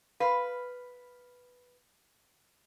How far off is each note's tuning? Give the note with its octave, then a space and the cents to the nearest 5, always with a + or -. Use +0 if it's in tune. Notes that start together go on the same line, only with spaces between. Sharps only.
B4 +0 F5 +0